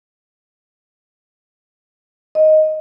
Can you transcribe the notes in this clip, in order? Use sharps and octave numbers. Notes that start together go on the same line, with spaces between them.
D#5